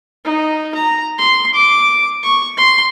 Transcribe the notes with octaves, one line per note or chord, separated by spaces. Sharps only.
D#4
A#5
C6
D6
C#6
C6